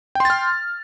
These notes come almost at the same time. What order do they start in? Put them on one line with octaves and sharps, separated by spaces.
G5 C6 A6 F6